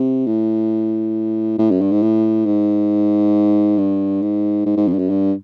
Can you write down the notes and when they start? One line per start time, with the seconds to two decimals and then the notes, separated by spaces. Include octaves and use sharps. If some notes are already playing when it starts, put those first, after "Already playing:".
Already playing: C3
0.26 A2
1.58 A2
1.71 F#2
1.81 G2
1.92 G#2
2.02 A2
2.46 G#2
3.78 G2
4.22 G#2
4.66 G#2
4.77 G#2
4.88 F2
4.93 G2
4.99 F#2
5.10 G2